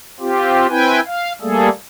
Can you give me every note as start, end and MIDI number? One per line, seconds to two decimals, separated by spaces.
0.20 0.67 60
0.20 0.67 65
0.20 0.67 67
0.69 1.00 60
0.69 1.00 64
0.69 1.00 71
0.69 1.00 79
0.69 1.00 80
1.06 1.33 77
1.41 1.69 55
1.41 1.69 57
1.41 1.69 58
1.41 1.69 68
1.41 1.69 69